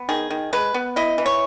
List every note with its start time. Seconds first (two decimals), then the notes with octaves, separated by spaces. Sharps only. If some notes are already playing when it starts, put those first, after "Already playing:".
Already playing: B3
0.09 D#3 G#4
0.30 D#3
0.53 G#3 B4
0.74 B3
0.96 E4 D#5
1.18 E3
1.26 C#5